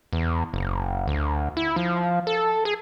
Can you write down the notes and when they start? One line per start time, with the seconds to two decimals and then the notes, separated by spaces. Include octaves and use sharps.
0.13 E2
0.54 F#1
1.07 D2
1.57 E4
1.76 F3
2.27 A4
2.65 G#4